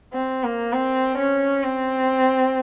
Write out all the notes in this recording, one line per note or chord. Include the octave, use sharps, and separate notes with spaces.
C4
A#3
C4
C#4
C4